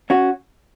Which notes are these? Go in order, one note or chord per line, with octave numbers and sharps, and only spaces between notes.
C#4 F#4